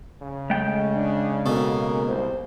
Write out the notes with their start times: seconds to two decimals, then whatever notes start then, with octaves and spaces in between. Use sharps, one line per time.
0.22 C#3
0.50 G#3 A3 G5
0.95 D4
1.46 B2 A#3 A4
2.08 C2 C5